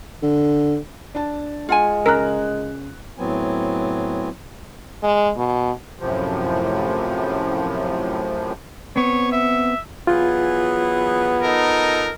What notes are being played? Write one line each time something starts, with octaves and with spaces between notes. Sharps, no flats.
D3
D4 A5
G#3 F4 F#5 G#5
C#3 G#4 A#4 F#6
A2 F#3 B3 C4 G#5
G#3
B2
F#2 A2 C3 F3
B3 C4 C#5
E5
E3 F#3 B3 F4 G#4
D#4 A4 A#4